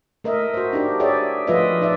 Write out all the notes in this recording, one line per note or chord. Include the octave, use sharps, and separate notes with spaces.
A3 A#4 D#5 E5
F#4 C5
D4 D#4 G4
G4 G#4 C#5 D5 E5
F3 A3 F4 B4 D#5 E5
D#4 D5 E5